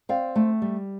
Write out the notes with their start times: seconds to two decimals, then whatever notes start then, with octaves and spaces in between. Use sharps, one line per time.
0.09 C4 D5 F5
0.36 A3
0.62 G3